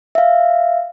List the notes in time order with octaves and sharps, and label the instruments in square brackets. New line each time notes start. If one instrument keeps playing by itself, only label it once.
[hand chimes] E5 F5